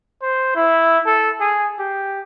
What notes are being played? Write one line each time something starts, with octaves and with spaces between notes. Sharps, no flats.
C5
E4
A4
G#4
G4